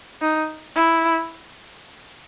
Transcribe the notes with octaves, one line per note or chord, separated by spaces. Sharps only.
D#4
E4